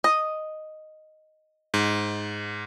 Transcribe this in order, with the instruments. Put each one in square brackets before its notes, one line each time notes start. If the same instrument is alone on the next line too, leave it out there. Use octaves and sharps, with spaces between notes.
[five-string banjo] D#5
[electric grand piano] G#2